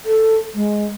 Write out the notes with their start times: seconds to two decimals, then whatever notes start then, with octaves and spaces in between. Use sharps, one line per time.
0.05 A4
0.54 G#3